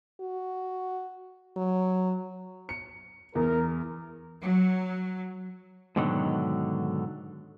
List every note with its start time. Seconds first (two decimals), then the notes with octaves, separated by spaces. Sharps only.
0.21 F#4
1.57 F#3
2.69 C#7
3.35 E2 A#4
4.40 F#3
5.96 G#2 B2 D3 D#3 F#3